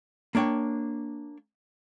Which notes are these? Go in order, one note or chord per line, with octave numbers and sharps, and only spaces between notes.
A#3 D4 C#5 G5